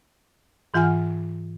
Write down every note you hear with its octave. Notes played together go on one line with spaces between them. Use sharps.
G#2 E3 F4 F#5 G#5 F6